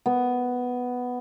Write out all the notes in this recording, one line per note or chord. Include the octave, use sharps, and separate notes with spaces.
B3